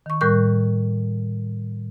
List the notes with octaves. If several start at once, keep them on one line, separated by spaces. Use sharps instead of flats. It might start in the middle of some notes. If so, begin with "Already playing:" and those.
D#3 C#6
A2 G3 A#4 C#6 F#6 G6